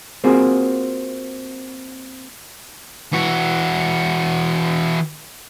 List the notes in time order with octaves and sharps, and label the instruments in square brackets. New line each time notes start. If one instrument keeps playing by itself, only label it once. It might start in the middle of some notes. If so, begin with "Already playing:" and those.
[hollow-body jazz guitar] A#3 C4 F4 F#4 G#4
[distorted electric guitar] E3 F#4